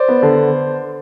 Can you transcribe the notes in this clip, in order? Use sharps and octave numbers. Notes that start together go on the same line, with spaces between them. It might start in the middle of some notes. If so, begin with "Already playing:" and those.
Already playing: C5 D5
B3
D3